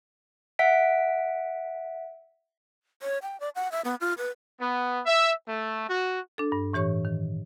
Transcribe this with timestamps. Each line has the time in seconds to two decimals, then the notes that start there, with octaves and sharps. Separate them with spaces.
0.59 E5 F#5 B6 D7
3.02 C#5
3.22 G5
3.40 D5
3.55 F#5
3.72 E5
3.85 B3
4.01 F4
4.18 B4
4.60 B3
5.06 E5
5.47 A3
5.88 F#4
6.38 D4 A4
6.52 G2
6.73 A2 E3 G4 C#5 C#6
7.05 D#3